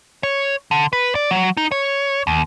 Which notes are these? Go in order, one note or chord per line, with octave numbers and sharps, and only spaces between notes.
C#5
D3
B4
D5
F#3
D#4
C#5
D#2